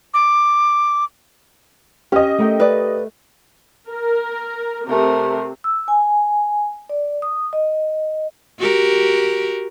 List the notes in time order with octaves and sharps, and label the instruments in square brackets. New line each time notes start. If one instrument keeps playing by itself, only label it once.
[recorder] D6
[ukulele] C#4 [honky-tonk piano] G4 D#5
[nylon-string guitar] A3 A#4 G5
[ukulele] B4 D5
[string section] A#4
[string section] C3 [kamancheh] A3 A#4
[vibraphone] E6
G#5
D5
D#6
D#5
[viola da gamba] F#4 G4 A#4